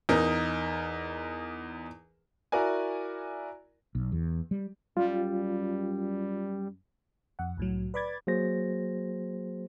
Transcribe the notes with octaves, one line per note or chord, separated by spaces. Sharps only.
E2 D#4 A#4
E4 F#4 A#4 D5 G#5
B1
E2
G3
F#2 G3 F4
F2 F#5
C2 A2 F#3
B4 D5 B5 D6 G#6 A6
F#3 A#3 F#4 G#4 C5 A#6